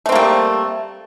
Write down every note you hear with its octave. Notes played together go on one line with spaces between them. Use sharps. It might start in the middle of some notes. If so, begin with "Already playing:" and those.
G3 A3 A#3 C4